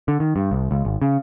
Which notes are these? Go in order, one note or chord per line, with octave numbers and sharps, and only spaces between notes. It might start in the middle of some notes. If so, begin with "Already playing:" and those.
D3
D#3
G2
C2
C#2
G#1
C#3